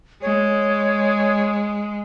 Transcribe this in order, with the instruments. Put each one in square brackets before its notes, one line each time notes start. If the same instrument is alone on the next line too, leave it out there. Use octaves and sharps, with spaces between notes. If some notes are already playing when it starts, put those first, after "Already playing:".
[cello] G#3 [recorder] C#5